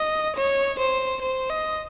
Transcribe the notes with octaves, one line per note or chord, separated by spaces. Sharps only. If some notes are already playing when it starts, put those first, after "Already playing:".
Already playing: D#5
C#5
C5
C5
D#5